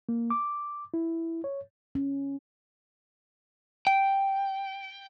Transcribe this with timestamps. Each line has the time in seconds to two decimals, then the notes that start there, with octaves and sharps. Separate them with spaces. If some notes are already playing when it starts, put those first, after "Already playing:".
0.09 A#3
0.30 D6
0.94 E4
1.44 C#5
1.95 C#4
3.87 G5